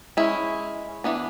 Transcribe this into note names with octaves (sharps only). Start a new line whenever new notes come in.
G#3 C#4 E4
E3 B3 D4